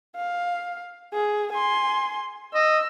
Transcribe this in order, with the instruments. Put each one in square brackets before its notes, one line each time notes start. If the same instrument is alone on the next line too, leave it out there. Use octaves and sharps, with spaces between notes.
[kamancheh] F5
G#4
G#5 C6
[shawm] D#5 [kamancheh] E6